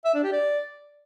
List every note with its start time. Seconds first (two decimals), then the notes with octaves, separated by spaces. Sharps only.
0.05 E5
0.14 D4
0.24 G4
0.33 D5